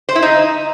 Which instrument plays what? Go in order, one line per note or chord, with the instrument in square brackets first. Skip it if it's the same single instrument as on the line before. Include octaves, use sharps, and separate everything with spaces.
[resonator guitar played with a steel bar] C5
E4
D#4